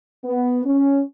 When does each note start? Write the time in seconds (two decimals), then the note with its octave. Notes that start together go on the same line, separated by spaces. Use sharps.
0.25 B3
0.65 C#4